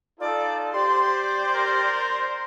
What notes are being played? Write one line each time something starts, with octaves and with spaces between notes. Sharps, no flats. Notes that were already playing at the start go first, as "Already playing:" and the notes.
D#4 F4 A4 D5
G4 C5 D5 C6
A#4